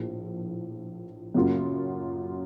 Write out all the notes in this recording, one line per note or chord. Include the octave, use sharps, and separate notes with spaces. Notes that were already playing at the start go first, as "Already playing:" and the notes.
Already playing: A#1 A2 F3 A#3
F#2 C#3 F#3 A#3 F4